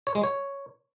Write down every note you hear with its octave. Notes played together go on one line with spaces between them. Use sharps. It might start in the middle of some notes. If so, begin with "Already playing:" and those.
C#5
G#3
C#5